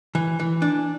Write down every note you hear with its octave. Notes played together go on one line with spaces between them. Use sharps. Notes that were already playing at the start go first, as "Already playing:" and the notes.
E3
E3
D4